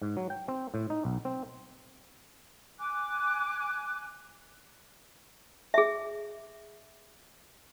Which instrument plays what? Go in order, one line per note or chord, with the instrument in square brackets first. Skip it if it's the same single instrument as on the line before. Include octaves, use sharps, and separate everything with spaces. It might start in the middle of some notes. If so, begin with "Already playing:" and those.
[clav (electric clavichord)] G#2
F#3
G5
C4
A2
D#4
B1
C4
[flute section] G#5 D6 F#6
[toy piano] G#4 E5